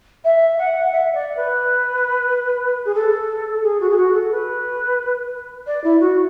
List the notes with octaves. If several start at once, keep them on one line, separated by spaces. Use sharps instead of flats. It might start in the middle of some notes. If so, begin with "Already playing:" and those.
E5
F#5
E5
D5
B4
G#4
A4
G#4
F#4
G#4
F#4
A4
B4
D5
E4
F#4